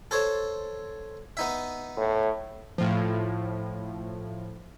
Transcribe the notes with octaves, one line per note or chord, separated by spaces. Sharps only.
A4 C5 C#5
B3 D#4 E5
A2
A2 F3